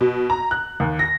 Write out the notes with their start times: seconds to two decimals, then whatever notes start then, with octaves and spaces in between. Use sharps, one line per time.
0.01 B2
0.30 A#5
0.51 F#6
0.80 D#2
0.99 A#6